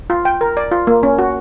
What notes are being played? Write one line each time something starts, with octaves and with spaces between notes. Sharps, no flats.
F4
G5
A#4
D5
F4
A#3
C#4
F#4